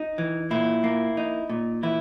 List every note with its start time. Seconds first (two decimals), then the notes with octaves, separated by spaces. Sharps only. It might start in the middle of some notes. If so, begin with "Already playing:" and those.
Already playing: D#4
0.18 E3
0.51 A#2 E4
0.84 A#3
1.17 D#4
1.49 A#2
1.83 E3 E4